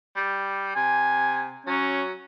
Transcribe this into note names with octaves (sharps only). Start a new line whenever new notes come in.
G3
C3 G#5
F#3 C#4